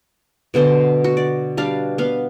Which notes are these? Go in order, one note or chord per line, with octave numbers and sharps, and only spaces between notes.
B2 D3 B3 C5
F#4
D5
G3 D4 F5
B3 F5